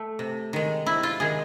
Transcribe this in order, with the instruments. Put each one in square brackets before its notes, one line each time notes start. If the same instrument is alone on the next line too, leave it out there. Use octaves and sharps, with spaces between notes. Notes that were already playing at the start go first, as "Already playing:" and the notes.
Already playing: [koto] A3
C3
D#3 G#3
C3 E4
F4
D#3 G#3 G#4